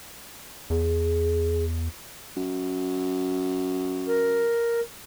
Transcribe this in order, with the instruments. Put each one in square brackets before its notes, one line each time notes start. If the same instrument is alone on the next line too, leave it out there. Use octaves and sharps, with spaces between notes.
[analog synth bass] E2 [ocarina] G#4
[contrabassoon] F#2
[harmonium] A#4